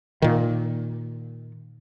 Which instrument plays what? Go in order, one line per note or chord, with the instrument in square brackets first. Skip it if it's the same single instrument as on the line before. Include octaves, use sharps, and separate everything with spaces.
[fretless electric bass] A#2 D#3